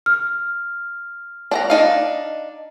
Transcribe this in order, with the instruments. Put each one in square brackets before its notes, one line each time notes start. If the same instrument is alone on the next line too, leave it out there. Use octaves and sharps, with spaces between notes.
[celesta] F6
[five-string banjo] D4 F#5 A#5
D4 D#4 F5